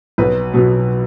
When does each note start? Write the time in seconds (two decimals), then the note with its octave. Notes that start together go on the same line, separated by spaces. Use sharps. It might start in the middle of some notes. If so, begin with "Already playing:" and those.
0.18 B1 B4
0.53 B2 F#3 B3